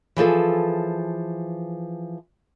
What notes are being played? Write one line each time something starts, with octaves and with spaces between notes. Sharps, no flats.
E3 F3 G#4 A4